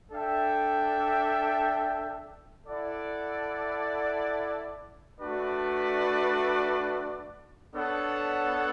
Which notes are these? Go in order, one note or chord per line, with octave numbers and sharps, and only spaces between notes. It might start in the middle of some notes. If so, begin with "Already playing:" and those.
D4 A4 E5 G5
E4 A4 D5 F#5
A3 D4 F#4 B4 D5
B3 D4 A4 C#5 F#5